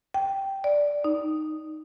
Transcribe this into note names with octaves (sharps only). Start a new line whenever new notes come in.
G5
D5
D#4